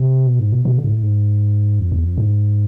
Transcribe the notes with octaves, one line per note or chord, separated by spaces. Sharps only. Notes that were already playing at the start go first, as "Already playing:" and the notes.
Already playing: C3
B2
G#2
B2
B2
D3
G#2
A2
G#2
F2
E2
F2
G#2